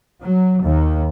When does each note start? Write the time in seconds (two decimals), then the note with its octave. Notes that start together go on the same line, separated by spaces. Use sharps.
0.22 F#3
0.64 D#2